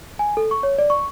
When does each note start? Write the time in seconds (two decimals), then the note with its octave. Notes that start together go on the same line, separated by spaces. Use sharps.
0.19 G#5
0.37 A4
0.51 C#6
0.63 C#5
0.78 D5
0.90 C#6